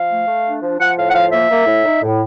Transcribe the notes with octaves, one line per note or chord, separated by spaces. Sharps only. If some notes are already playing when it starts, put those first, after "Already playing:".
Already playing: F3 F5
A3
A3
D4
F3
F3 F#5
A2 F5
F#5
F3 F5
A#3 E5
A#3
A2
D#4
A2